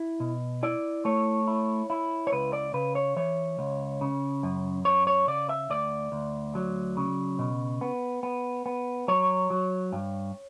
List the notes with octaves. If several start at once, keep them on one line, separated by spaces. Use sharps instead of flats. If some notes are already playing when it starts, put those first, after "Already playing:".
Already playing: E4
B2
E4 D5
A3 C#5
E4
E4
C#5
C#2 B4
D5
C#3 B4
C#5
E3 C#5
C#2
C#3
F#2
F#2 C#5
C#5
C#3 D5
E5
D2 D5
D2
F#3
C#3
B2
B3
B3
B3
F#3 C#5
F#3
G2